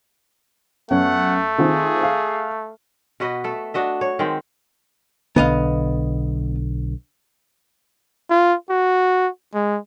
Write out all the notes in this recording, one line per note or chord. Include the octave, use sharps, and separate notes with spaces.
F#2 A3 B3 C#4 F#5
D#3 C4 F4 G#4
F5
B2 F#4 B4 D#5
A3 A4
D4 F#4 D#5 E5
C#5
D#3 G#3 C4
B1 D3 B3 D#5 F5
F4
F#4
G#3